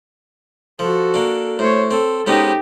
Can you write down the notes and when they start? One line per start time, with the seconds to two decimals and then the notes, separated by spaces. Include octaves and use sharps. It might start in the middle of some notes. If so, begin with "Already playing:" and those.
0.79 F3 F#4 A4
1.14 A#3 D4
1.59 A2 C5 C#5
1.91 C4 A4
2.27 G#2 B3 C#4 D#4 G4